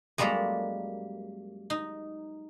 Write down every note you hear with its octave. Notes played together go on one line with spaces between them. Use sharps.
F#2 G3 G#3 A#3 A4 A#5
D#4